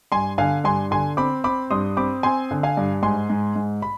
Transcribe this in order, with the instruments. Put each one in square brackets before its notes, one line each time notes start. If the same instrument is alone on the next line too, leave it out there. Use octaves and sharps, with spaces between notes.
[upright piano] G2 [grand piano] G#5 C6
[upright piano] D3 [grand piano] F5 G#5
[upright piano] G2 [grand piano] G#5 C6
[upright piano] D3 [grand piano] G#5 C6
[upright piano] C4 [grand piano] B5 D6
[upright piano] C4 [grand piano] B5 D6
[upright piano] G2 [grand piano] C6 D#6
[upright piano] C4 [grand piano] B5 D6
[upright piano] C4 [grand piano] G#5 C6
[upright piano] D3
[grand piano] F5 G#5
[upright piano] G2
[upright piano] G#2 [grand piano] G#5 C6
[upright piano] G#2
G#2
[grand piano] B5